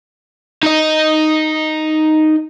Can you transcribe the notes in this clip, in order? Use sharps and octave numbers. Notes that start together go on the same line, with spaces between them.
D#4 D#5